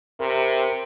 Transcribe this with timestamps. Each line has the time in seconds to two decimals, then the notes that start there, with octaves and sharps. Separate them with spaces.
0.20 C3 A#4 B5